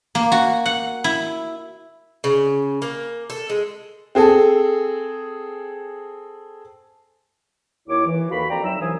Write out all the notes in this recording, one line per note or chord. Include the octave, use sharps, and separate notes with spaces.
A#3
F#4
F#5
E4
C#3
A#3
A4
G#3
C4 G#4 A4
D#2 E4 C#5 D6
E3
D#2 F#4 A4 F5 B5
F2 D5 G5 A#5
D2 F#3 D#4 E5 E6
C2 E3 F#3 C5 G#5 D#6